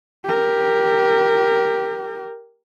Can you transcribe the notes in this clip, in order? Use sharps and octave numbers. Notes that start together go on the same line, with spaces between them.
G4 A#4